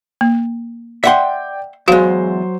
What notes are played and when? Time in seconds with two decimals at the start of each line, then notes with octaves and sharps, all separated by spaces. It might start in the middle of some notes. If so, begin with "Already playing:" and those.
0.21 A#3
1.04 D5 E5 F#5 G5 C6
1.88 E2 F#3 G#3 F#4 C5 F5